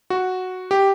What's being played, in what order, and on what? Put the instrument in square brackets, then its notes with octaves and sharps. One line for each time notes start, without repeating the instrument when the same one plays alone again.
[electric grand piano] F#4
G4